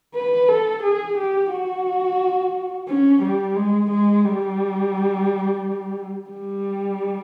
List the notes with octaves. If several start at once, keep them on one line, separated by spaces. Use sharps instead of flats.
B4
A4
G#4
G4
F#4
C#4
G3
G#3
G#3
G3
G3